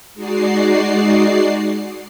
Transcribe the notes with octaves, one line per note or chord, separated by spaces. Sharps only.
G#3 D#4 F#4 D5 C7